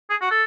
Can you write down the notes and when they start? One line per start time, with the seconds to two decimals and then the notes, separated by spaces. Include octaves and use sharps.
0.10 G#4
0.21 F#4
0.31 A4